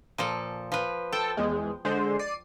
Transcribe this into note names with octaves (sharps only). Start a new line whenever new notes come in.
A#2 F3 A4
F3 B4
A4 G5 A5
E2 G#3
D3 G#3 C5
D5 C7 D#7